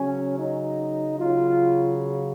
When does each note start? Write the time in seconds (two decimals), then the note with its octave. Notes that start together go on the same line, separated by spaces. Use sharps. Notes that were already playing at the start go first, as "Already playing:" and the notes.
Already playing: C#3 F#3 C#4
0.39 D#4
1.18 C#3 F#3 F4